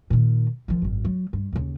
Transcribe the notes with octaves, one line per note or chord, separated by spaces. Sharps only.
A#2 D#3
D#3 F3
G#1 F#2
F#3
G2
D#2 C#3